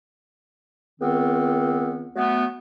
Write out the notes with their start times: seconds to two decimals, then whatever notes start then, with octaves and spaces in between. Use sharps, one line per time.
1.00 C#2 D#3 B3 C4
2.16 F#3 A3 B3